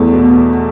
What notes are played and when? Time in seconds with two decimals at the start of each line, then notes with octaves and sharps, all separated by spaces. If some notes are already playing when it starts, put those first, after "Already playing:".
Already playing: E2 A3
0.14 B2